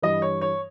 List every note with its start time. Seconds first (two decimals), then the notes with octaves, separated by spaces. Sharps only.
0.02 G2 E3 G3 D#5
0.22 C#5
0.41 C#5